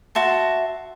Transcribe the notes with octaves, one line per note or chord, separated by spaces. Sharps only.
F#4 E5 A5 C6